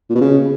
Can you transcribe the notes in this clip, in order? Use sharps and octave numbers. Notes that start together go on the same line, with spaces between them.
A#2
B2
C#3